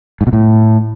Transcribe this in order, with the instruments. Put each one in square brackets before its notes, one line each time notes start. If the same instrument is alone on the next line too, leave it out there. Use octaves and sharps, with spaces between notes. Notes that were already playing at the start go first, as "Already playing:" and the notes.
[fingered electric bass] G#2
B2
A2